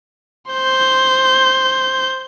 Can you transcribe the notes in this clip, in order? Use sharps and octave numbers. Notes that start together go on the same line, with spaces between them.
C5 G6